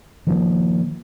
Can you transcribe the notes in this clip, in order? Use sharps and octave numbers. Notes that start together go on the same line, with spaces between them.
D#3 F3 A#3